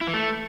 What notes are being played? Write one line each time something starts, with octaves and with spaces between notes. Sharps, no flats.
E4
E3
A3